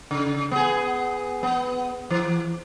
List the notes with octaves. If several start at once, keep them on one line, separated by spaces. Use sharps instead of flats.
C#3
B3 G#4
B3
E3